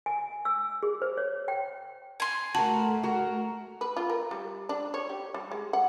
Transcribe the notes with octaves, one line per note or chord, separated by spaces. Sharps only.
G#5
E6
G#4
C5
C#5
G5
G#5 C6
A3 F#4 A#4 A5
F#4 A#4
B4
F4
A#4
G3
D4
C#5
G4
G3
G#3
F#5